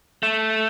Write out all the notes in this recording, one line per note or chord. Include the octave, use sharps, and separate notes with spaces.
A3